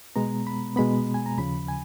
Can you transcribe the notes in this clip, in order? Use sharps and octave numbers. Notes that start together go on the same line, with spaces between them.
B2 G#3 B3 A#5
B5
B2 G#3 B3 B5
G#5
A#5
D#2 C#3 F3 B5
G#5